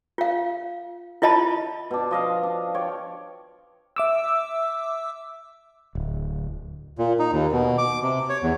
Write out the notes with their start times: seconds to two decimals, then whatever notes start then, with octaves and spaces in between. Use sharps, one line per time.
0.18 F4 F5
1.22 E4 F4 D#5 A5 B5
1.91 B2 D4
2.11 F3 D#5 F5
2.43 D4
2.74 C#5 D5 G5
3.96 E5 D6 E6
5.95 D1
6.98 A#2
7.19 D#4
7.33 D#2
7.52 B2
7.78 D6
8.03 C3
8.29 C#5
8.43 E2